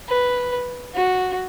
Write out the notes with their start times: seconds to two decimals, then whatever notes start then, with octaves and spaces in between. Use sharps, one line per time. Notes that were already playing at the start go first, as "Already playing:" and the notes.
0.08 B4
0.95 F#4